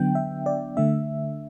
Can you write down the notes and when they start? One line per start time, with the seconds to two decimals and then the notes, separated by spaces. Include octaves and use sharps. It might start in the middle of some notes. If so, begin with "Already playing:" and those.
Already playing: D3 F#3 B3 D4 G5
0.15 E5
0.46 D5
0.77 D3 A3 D4 E5